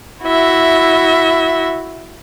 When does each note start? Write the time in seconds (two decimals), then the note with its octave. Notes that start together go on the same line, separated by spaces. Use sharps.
0.23 E4 F#4 E5